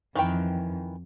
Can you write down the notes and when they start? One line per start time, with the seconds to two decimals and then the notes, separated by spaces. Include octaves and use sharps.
0.15 F2 D#3 E3 G5